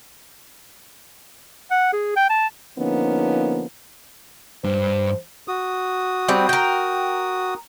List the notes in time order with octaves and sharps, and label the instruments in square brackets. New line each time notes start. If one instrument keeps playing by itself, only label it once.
[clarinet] F#5
G#4
G5
A5
[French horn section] D3 F3 A#3 B3 C#4 D#4
[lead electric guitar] G2 [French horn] C5
[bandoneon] F#4 D#6
[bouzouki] G3 C4
A#4 G5